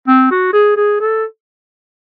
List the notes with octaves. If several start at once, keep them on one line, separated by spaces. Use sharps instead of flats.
C4
F#4
G#4
G#4
A4